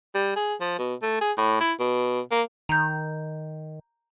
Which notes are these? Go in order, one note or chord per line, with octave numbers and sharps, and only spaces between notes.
G3
G#4
F3
B2
A3
G#4
A2
E4
B2
A#3
D#3 A#5 G6